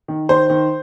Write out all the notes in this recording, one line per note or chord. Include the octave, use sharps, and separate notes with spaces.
D#3
D#3 C5
D#3